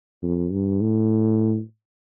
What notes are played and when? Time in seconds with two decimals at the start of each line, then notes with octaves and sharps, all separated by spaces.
0.23 F2
0.52 G2
0.81 A2